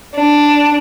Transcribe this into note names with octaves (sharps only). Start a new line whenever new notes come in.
D4